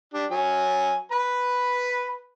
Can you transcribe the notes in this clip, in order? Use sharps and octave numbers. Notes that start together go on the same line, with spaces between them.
D4 G4
F#3 G#5
B4 B5